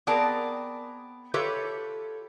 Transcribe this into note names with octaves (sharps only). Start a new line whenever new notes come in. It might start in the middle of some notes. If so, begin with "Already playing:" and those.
B3 C4 G#4 A#4 D5 A5
F4 G4 A4 B4 C#5 E5